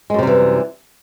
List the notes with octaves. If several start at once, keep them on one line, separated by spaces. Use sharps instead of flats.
F#2 C3 E3 G3 G#3